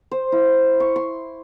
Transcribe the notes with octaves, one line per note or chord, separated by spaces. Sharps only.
C5
E4
C#6
C6